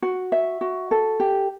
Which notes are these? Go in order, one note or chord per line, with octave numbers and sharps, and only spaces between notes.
F#4
E5
F#4
A4
G4